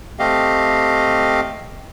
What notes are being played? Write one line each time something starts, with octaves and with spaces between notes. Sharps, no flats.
A3 C4 G4 D#5 F5